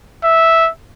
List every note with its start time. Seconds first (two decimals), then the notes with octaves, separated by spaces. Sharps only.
0.24 E5